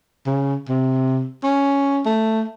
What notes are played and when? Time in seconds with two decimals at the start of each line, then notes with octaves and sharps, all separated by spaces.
0.27 C#3
0.69 C3
1.44 C#4
2.06 A3